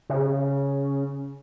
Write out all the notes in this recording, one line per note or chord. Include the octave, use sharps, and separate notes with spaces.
C#3